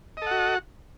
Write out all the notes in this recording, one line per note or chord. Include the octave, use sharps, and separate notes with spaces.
F#4 A4 D#5 F#5